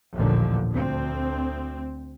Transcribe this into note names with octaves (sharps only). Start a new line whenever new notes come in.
A1 D#2 A#2 D3 F3
D2 C4